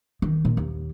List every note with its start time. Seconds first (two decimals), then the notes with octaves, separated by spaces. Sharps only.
0.22 D#3
0.45 A#2
0.57 D#2